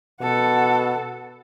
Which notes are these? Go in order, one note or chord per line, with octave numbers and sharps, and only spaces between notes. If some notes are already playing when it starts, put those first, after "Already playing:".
B2 A4 F#5